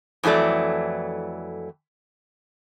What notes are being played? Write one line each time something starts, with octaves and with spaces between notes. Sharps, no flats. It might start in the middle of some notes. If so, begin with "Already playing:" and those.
F2 E3 F#3 A3 D5